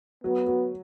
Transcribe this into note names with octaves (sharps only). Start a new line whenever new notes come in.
F#3 B3
F#3